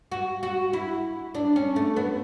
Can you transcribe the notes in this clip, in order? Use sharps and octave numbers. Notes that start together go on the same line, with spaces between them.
F#4
F#4
E4
D4
C#4
A3
B3